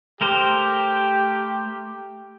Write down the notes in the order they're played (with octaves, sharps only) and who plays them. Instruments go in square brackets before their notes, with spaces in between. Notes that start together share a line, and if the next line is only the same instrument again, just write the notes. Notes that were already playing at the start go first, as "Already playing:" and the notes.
[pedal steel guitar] A3 A#4 C5 [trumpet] G4